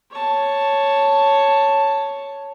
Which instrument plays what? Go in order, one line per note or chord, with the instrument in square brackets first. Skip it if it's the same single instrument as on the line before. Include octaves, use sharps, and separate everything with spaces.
[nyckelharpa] C#5 A5